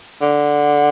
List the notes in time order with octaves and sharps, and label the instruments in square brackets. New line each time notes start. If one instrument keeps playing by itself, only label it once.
[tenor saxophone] D3